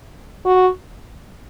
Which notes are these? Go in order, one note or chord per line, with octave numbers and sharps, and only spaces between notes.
F#4